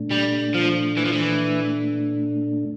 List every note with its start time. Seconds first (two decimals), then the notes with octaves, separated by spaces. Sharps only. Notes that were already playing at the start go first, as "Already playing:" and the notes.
Already playing: A#2 A3 D4
0.11 G3
0.55 F3
0.97 E3
1.05 F3
1.13 E3